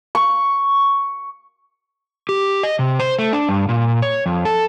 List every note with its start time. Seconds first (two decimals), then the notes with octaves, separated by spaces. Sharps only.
0.15 C#6
2.29 G4
2.63 D#5
2.79 C3
3.00 C5
3.19 A3
3.33 D4
3.49 G2
3.69 A#2
4.02 C#5
4.26 F2
4.45 A4